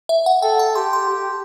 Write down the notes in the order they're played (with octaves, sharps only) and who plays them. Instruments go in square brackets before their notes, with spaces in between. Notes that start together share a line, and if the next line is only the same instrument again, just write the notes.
[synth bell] E5
F#5
[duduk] A4 [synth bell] G5
[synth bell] A5
[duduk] G4 [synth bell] C6
[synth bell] C6
[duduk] G4